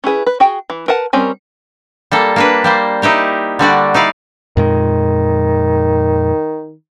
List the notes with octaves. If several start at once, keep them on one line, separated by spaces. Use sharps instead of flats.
C#4 E4 G#4 B4
B4
F#4 G#4 G5
E3
A#4 B4 F#5 A5
G3 C4 C#4 A#4 G#5
G3 A#3 A4
A#3 D4 B4
G3 A#3 C5
D#4 E4 G4 A#4
D3 G3 F#4 D5
D#4 E4 D5 F5
F2 A#2 D#3 G#3